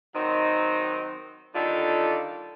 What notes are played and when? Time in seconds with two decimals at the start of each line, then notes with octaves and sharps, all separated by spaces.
0.15 D#3 F#3 C4 D#4
1.55 D3 D#3 G3 F4 A4